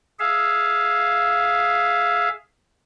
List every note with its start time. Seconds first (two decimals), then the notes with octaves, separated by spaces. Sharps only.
0.19 G#4 E5 F5